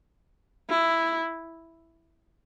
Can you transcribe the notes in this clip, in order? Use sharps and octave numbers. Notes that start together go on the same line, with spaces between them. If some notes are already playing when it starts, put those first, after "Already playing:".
E4